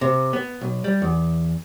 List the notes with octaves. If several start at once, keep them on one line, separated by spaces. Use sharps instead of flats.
C3
B3
B1
G3
E2